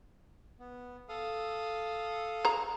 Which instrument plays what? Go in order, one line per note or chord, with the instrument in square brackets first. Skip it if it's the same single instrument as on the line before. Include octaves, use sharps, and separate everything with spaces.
[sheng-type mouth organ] B3
A4 F5 D#6
[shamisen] G#4 A#5